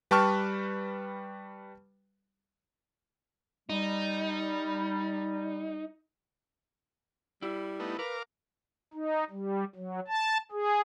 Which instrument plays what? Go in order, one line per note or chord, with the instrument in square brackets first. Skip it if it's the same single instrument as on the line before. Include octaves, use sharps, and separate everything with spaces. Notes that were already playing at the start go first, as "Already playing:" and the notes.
[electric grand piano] G3 B4 G5 A5 C#6 F6
[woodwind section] G3 [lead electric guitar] D#4
[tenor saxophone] G3 [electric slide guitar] E4
[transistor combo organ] A3 B3 D#4
[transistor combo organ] A#4 F5 D6 [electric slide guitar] B4
[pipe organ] D#4
G3
F#3
A5
G#4